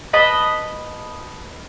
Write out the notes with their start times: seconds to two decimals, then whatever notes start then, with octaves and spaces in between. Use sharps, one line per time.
0.13 B4 D#5 A5 B5